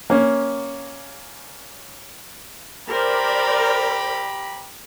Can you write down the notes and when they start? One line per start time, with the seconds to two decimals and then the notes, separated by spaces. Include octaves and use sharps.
0.10 A#3 C#4
2.88 G4 A#4 C5 D5 A#5 B5